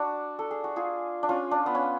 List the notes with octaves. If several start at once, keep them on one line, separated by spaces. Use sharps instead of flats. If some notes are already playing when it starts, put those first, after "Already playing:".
Already playing: D4 F#4
A4
G#4
F#4
F4 G#4
D4
C#4 F4
D4
B3
C#4